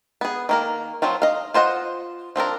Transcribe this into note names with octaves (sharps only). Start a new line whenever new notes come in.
B3 G#4
D#3 A#3 A#4
F3 F#3 C4 F4
D#5 F5
F4 C5 D#5 F#5
F3 C4 D4 A#4